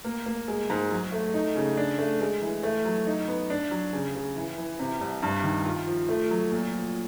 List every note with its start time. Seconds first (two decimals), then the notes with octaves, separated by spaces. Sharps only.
0.04 A#3
0.26 A#3
0.48 G#3
0.70 G#2
0.91 F#3
1.12 A3
1.34 D#4
1.56 C#3
1.77 D4
1.98 A3
2.21 G#3
2.42 E3
2.63 A3
2.85 F#3
3.07 D#4
3.28 B3
3.50 D4
3.71 F#3
3.93 C#3
4.15 C#3
4.36 E3
4.58 E3
4.79 C3
5.01 C2
5.23 G2
5.43 D#3
5.65 F4
5.87 F3
6.09 A3
6.30 F#3
6.52 A#2
6.73 F3